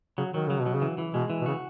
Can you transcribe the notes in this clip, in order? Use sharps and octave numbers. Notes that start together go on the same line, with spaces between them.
C#3 F#3
D#3 F#3
C#3 F#3
B2
F#3
C#3
E3
E3
B2 G#3
E3
B2
C#3 F#4